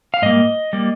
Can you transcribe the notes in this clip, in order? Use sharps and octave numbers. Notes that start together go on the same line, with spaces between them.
F5
G#2 G3 A#3 D#5
G3 A#3